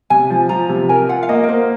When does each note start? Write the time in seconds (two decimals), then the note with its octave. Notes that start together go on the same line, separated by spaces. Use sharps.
0.10 C3 G#5
0.30 F3
0.49 F3 A#5
0.69 C3
0.89 A#4 G#5
1.09 F4 F#5
1.23 F5
1.29 A#3 D#5
1.44 A#4
1.49 A#3 C5